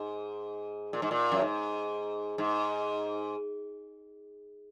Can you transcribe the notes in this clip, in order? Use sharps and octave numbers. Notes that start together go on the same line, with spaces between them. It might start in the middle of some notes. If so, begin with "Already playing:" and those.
Already playing: G#2
A#2
G#2
A#2
F#2
G#2
G#2